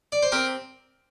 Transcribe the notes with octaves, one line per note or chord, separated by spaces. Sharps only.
D5
C5
C4 G4 A#4